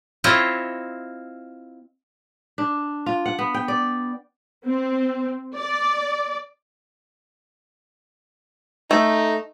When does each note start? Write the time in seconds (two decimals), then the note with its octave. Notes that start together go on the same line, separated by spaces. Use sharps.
0.24 C4 E4 F4 C5 C#5 D#5
2.58 D4
3.06 F4
3.26 F#5
3.39 B3
3.54 G5
3.68 D5
4.65 C4
5.56 D5
8.91 A3 D#4